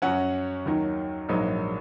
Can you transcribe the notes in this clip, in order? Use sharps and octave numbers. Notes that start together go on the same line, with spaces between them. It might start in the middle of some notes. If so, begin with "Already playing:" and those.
F#2 F#3 C#4 F#5
D#2 D#3 F#3
A#1 G#2 F#3 A#3 D#4